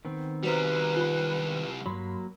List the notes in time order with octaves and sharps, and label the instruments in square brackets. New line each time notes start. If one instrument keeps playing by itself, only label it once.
[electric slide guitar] D#3 B3 C4
[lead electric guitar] C2 G3 [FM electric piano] F#4 C5 A#5 [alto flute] B4
[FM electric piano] F4 B5
[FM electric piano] G2 B5 C6 [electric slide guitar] F#3 A#3